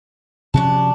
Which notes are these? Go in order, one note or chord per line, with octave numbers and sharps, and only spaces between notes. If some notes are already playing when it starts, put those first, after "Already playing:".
C3 F3 C#4 D4 F#4 A5